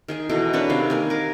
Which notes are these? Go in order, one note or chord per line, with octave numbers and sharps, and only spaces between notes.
D#3 G#4 G#5
B2 E3 D#4 A4
D4 A4 B4 C#5
C3 D#3 F5
A#3 G#5
A#4 D6